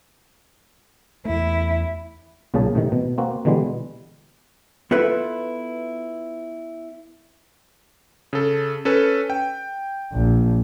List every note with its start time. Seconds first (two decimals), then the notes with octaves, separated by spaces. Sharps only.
1.25 E2 A3 E4
2.54 B1 A#2 C#3 C#4 G#4 A5
2.75 A2 C3 D#3
2.92 B2
3.18 A#3 C4 F#4
3.45 B2 D3 E3 G3 G#3
4.91 B3 E4 F4 A4 B4 E5
8.33 C#3 A4
8.85 C#4 A4 B4
9.30 G5
10.13 A#1